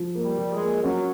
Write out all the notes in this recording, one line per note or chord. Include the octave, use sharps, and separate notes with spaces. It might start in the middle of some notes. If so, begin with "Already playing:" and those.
Already playing: F3
A#3
G3
F3
G#3
A#3
F#3 C#4